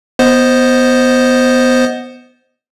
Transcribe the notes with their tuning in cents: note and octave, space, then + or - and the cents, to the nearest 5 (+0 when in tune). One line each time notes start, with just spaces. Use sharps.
B3 +0 C5 +0 D#5 +0